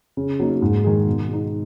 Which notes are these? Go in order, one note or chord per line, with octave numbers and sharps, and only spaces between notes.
C#3
F#3 A#3 D#4
G#2
D#3 G#3 D#4 G#4
B2
G#3 D#4